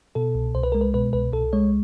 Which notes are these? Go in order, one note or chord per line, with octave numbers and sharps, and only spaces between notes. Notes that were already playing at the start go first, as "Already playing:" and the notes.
B2 A4
C2
C2 C5
B4
G#3 A#4
B4
B2 B4
C2 B4
C2 A4
G#3 C#5